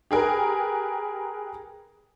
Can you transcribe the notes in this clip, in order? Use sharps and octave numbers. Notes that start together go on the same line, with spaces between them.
G4 G#4 A#4 B4